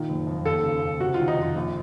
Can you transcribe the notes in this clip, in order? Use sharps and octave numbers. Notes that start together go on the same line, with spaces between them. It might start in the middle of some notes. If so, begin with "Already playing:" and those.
Already playing: A#2 D#3
F#1
F2
D#2 A4
C#3
C#3
C3 F#4
D#3 F4
D#4
F2 F4
A#1